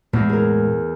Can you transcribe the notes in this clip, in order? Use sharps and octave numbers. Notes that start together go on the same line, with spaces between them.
E2 A2 G#3
G#4 A#4